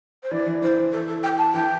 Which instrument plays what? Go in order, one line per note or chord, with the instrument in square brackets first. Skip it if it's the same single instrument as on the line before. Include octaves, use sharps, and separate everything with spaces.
[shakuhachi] C5
[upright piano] E3 [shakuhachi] D5
[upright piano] E3
[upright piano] E3 [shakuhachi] C5
[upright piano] E3
[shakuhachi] A4
A4
G5
A5
[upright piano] E3 [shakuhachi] G5